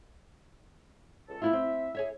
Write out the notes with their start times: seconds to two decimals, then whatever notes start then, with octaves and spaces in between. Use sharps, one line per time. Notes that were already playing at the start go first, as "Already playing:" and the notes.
1.28 C#2 A4
1.42 B3 E4 F4 E5
1.53 C4
1.95 G#4 C#5 E5